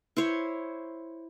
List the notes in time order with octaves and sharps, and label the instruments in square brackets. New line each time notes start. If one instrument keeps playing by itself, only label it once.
[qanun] E4 C5 C#5